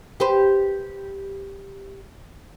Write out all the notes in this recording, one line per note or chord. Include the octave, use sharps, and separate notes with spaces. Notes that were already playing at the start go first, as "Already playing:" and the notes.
G4 B4 C5